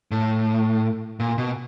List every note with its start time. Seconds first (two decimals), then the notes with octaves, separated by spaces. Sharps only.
0.11 A2
1.20 A#2
1.38 B2